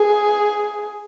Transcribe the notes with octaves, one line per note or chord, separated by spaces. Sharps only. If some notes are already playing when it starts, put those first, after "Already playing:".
Already playing: G#4